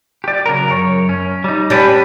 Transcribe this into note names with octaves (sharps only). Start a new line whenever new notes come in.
G4 D5
C#3 F#3 A#4
F#2 C#5
C#4
G3 D#4
G3 C#4 D4 G4 B4